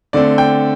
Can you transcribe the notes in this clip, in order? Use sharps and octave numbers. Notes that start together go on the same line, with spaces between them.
D3 A3 C4 D5
G5